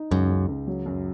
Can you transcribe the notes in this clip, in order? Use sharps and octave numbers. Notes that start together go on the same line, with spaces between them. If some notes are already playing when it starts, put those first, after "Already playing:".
Already playing: D#4
C#2 F#2
C#2
C#2
F#3
F#2